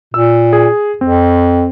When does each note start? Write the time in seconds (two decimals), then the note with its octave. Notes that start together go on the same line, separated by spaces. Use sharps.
0.14 A#2 E6
0.53 G#4
1.01 F2 C4